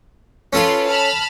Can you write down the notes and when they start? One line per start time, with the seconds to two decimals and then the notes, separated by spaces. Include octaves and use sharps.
0.53 C#4 F4 A4 B4 G#5
0.87 A5 B5 F6